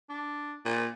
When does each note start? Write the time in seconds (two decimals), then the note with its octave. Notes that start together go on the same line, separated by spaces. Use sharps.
0.10 D4
0.65 A#2